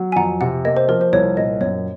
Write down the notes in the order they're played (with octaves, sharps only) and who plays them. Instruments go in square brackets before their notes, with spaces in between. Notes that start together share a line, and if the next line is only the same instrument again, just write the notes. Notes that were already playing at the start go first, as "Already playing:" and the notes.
Already playing: [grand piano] F#3
[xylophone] G#5
[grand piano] F2 [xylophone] F#5 A#5
[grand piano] C3 [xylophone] F#5
[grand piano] A#3 [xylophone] D#5
[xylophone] C5
[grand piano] F3 [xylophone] A#4
[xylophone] C5
[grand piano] C2 [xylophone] C#5
[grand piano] A#2 [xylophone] D#5
[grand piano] F#2 [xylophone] C#5